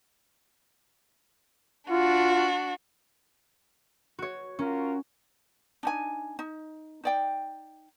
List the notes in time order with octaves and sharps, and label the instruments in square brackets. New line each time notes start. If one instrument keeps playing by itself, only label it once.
[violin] D4 F#4 [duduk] F4
[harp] F#4 C#5
[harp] C#4 [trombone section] F4 F#4 A#4
[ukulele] D4 D#4 G#5
D#4
D#4 D5 G5